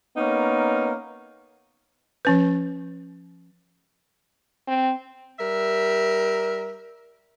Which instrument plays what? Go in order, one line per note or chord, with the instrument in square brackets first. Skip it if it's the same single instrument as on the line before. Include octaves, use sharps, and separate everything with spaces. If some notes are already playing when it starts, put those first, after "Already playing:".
[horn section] A#3 B3 C#4 D#4 A#4
[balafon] F3 C#4 B4
[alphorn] C4
[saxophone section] G3 A#4 E5